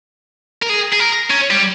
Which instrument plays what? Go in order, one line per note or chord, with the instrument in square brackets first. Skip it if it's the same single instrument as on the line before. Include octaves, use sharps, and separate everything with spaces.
[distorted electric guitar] A#4
G#4
G#4
A#4
C#4
G3